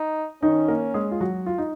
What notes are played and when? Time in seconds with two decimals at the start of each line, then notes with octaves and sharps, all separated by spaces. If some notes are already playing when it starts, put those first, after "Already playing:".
Already playing: D#4
0.43 D#3 C#4 D#4
0.68 A#3 A#4
0.94 G#3 G#4
1.11 F4
1.21 F#3 F#4
1.46 F4
1.58 D#4